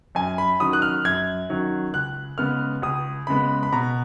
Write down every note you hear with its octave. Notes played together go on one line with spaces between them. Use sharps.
F#2 G#5
B5
D#3 F#3 C#4 D#6
F#6
F6
F#2 G#6
D#3 F#3 C#4
C#2 F#6
C#3 G#3 B3 F6
C#2 D#6
C#3 G#3 B3 B5
B5
B2 A#5